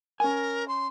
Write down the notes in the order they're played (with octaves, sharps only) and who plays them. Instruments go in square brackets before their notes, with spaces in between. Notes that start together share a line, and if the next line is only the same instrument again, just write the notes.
[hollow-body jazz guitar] C#4 G#5 [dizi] A#4
[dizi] C6